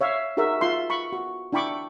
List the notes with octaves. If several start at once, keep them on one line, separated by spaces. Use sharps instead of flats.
C#5 E5 F5
D#4 F#4 G#4 A#4 E5
F4 E5 C6
B5 C#6
F#4
D4 E4 G5 B5 C#6 D6